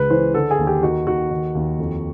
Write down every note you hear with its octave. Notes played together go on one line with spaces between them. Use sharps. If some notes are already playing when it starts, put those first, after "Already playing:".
Already playing: C#2 B4
E3 C5
D3 A4
G#4
D#2
G4
D#3 F#4
D#2 F#4
D#3
D#2
F2